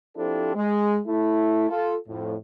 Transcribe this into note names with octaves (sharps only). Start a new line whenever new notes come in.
F3 C4 D4 E4 G4 A4
G#3
A3 E4
F4 A4
F2 A2